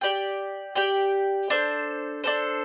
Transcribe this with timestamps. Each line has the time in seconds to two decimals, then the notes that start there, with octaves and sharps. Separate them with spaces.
0.01 G4 D5 G5
0.75 G4 D5 G5
1.50 D4 A4 C5
2.24 D4 A4 C5